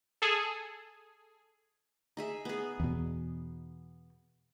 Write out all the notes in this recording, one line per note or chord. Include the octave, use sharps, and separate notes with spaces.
G#4 A4
D#4 G#4 E5
B3 G#4
E2 B2